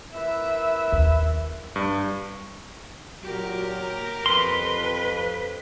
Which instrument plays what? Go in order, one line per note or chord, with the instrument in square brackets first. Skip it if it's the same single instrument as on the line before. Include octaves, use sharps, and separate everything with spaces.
[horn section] E4 A#4 B4 [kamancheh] E5
[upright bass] D#2
[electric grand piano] G2
[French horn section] A#2 F#3 F#4 [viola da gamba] G4 A#4
[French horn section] F2 [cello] B4 [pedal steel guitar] C6